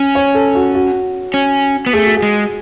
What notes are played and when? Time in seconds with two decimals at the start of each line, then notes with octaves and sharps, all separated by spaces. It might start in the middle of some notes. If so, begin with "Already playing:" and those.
Already playing: C#4
0.15 C#5
0.35 A4
0.55 F#4
0.75 F#4
1.34 C#4
1.86 B3
1.93 A3 G#4
2.05 F#4
2.17 G#4
2.22 G#3